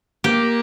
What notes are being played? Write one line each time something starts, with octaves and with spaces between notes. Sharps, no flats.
A#3 G4